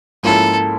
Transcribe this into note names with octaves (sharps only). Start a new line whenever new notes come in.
G#2 F3 A#3 C#4 E4 A4